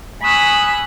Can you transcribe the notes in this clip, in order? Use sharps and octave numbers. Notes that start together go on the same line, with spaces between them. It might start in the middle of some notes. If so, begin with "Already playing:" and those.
G#5 B5 C#6 D#6 E6 F#6